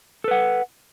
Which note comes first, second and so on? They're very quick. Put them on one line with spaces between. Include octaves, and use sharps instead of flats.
A4 B4 F#5